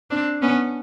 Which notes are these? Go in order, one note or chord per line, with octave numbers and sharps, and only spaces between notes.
C4 D4
B3 C#4